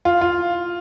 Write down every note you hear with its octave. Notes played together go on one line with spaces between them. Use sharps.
F4
F4